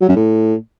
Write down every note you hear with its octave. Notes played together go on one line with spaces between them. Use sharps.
F#3
F#2
A2